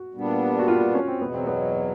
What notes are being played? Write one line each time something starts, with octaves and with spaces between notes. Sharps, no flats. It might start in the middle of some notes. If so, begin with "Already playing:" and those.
Already playing: F#4
A#2 G3 B3 D4
F#4
F4
C#4
C4
E2 B2 F#3 B3
C4
B3